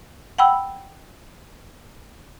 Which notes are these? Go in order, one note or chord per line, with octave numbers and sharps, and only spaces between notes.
F#5 G5 B5 E6